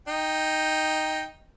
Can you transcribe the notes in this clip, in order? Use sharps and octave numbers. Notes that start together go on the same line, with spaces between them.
D#4 G5